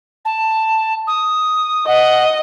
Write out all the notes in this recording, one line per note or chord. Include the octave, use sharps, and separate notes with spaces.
A5
D#6
D#5 F#5